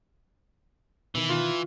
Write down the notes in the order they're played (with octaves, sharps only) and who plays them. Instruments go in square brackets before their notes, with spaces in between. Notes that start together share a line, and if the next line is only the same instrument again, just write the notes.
[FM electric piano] B2 D#3 [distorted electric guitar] E3
[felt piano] F4